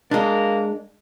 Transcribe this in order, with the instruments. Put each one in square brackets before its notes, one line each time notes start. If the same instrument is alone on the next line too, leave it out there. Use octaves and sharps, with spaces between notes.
[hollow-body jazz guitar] G#3 D4 [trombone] A#3